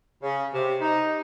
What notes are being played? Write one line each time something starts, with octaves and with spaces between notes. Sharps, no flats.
C#3
C3
D#4